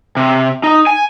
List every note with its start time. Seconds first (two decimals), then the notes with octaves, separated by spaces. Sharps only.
0.17 C3
0.63 D#4
0.87 G#5